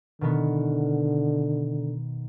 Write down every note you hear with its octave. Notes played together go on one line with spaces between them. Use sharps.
B2 D3 D#3 B3